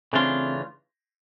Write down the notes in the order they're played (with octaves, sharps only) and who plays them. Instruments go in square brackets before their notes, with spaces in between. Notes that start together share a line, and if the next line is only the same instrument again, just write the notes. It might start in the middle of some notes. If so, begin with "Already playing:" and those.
[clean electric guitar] C#3 E3 A3 D4 F4 [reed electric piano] C4